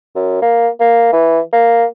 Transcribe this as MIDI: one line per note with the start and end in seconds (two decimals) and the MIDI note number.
0.16 0.40 42
0.42 0.68 58
0.80 1.11 58
1.13 1.40 52
1.53 1.85 58